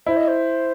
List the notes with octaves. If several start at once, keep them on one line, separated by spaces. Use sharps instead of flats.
E4 C5
D#5
C5